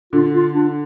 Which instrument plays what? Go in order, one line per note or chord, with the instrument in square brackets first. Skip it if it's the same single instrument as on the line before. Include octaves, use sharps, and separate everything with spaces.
[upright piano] D3 [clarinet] F4
[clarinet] F4
D4